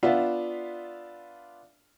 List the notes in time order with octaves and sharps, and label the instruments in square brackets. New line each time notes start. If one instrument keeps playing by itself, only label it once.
[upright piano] B3 D4 F4 E5 F5